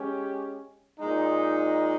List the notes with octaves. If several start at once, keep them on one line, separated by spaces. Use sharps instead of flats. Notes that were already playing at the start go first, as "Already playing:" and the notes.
Already playing: G#3 C#4 G4
A#2 G#3 D#4